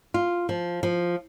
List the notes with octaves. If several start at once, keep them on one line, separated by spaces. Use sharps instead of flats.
F4
F3
F3